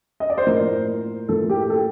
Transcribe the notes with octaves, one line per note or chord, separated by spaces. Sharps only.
D#5
D5
C5
A2 F3 A#3 A#4
A2 F3 A#3 A4
G4
G4
A4